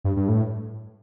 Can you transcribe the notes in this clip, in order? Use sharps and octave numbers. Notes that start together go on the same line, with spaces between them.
G2
G2
A2